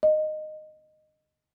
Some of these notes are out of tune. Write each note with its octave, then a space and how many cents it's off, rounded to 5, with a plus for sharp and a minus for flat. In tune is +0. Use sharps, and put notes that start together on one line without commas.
D#5 -10